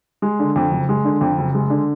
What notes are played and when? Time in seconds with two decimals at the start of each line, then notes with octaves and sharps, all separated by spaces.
0.22 G#3
0.39 D3
0.56 F2
0.72 F#1
0.89 G#3
1.05 D3
1.21 F2
1.38 F#1
1.54 G#3
1.70 D3